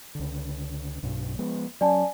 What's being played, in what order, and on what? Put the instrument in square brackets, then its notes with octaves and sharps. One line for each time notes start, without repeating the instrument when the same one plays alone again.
[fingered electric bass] C#2 D3
B1 G2 B2
F3 G#3 B3
[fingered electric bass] F#3 C#4 [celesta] D5 G#5 A5